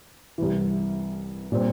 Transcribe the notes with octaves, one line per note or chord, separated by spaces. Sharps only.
C2 C3 E3
A#2 G3 C4